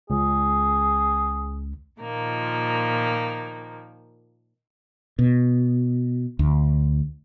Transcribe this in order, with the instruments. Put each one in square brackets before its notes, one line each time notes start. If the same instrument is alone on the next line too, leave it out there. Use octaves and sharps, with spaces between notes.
[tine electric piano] C#2 [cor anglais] G#4
[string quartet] A#2 D#3 F3 A#3
[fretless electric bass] B2
D2